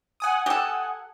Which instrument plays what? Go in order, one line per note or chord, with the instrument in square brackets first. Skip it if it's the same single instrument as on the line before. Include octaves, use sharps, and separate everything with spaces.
[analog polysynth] F#5 G#5 D#6
[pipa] G4 A4